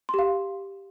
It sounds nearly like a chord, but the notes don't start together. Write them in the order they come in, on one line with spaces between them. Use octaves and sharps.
C6 G4 F5